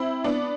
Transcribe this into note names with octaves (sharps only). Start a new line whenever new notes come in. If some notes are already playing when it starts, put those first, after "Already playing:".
Already playing: C4 E4
B3 D4